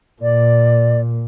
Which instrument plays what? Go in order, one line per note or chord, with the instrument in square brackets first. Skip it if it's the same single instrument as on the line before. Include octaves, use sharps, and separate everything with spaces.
[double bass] A#2 [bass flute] D5